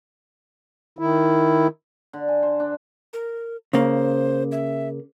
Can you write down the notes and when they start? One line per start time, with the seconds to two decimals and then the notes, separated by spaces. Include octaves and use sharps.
0.99 D#3 E4
2.13 D3
2.28 G#5
2.43 C5
2.60 D4
3.13 A#4
3.73 C#3 A#3 C5
4.52 E5